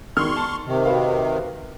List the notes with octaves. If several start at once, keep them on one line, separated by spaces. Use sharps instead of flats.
E1 D#3 C6 C#6 F6
A5
C3 D#3
F#4 B4 F5